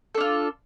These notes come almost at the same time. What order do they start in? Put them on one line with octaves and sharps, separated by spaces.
A4 D4 F4